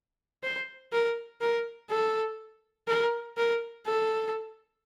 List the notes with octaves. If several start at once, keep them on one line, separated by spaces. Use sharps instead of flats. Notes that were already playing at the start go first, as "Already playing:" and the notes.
C5
A#4
A#4
A4
A#4
A#4
A4